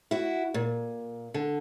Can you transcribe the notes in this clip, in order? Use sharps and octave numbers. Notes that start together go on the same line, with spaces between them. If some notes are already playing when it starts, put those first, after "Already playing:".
E4 F#4
A#2
D3